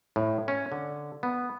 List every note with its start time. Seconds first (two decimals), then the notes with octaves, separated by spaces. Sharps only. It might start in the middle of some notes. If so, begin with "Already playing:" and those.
0.16 A2
0.48 C#4
0.72 D3
1.23 B3